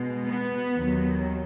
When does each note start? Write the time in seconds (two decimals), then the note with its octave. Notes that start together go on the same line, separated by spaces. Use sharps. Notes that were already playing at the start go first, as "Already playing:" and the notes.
Already playing: B2 G#3
0.29 B3
0.78 D#2 D#3 F#3